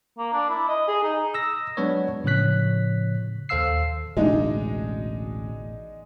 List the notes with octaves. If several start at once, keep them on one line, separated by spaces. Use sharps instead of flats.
A#3
D4
E4
D#5
G#4
D#4
D#6 E6 A#6
F#3 G#3 B3 D4 B4 C#5
A2 C#3 F3 C#5 F#6 B6
D#2 A4 C5 F5 E6 C7
A1 D2 B2 G#3 D4 D#4